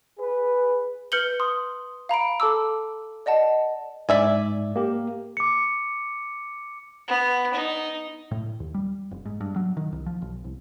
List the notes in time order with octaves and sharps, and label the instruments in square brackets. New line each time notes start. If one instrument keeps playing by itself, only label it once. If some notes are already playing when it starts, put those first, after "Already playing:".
[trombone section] G#4 B4
[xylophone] B4 F6 G6 C#7 F#7 G7
C6 D#6
F5 A#5 B5 D7
A4 A5 D6 E6
D5 D#5 F#5 A5
[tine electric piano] G#2 [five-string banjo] D5 E5 G#5
[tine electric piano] A#3 G4
[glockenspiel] D6 C#7
[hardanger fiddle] B3
D#4
[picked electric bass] A2
D#2
G3
F1
G#2
G2
F#3
D#3
C2
F3
B1
C2